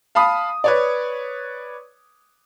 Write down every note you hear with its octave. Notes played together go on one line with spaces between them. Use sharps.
F5 A5 B5 D#6
B4 C#5 D5